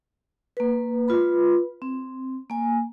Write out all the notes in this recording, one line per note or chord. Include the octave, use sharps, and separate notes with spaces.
A#3 B4
F4 B4 B5
C4
A#3 G#5